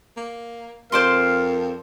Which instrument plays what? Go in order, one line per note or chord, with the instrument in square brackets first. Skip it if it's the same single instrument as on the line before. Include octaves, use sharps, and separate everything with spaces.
[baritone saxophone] A#3
[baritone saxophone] F2 [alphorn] A#4 [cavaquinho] C5 D5 C6 [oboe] F5